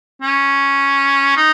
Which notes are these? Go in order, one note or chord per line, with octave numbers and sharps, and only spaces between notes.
C#4
D#4